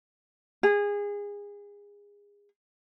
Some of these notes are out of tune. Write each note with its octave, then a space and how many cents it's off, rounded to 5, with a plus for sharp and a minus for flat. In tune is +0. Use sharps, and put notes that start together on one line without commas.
G#4 -25